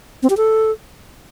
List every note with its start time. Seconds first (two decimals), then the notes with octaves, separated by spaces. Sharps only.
0.23 C4
0.30 G4
0.37 A4